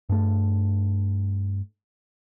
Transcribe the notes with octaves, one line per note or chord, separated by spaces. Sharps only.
G2 A3